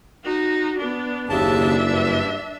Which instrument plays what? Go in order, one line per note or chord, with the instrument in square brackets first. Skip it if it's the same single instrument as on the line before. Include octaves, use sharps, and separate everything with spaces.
[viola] D#4 F#4
B3 D4
[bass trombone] F#1 [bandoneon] D#2 C#3 A5 [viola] D4 E5
[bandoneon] G2